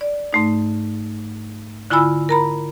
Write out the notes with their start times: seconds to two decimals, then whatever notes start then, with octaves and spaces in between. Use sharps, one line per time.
0.01 D5
0.33 G#2 A3 D#4
1.90 D3 E4 F4 G#5 B5 E6
2.29 A#4 A#5 B5